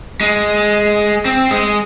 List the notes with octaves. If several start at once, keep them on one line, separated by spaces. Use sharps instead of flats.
G#3
C4
G#3